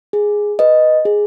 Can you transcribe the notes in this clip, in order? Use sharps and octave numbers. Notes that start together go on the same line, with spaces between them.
G#4
B4 D#5
G#4